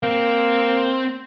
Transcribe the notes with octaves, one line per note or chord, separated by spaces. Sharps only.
A#3 C4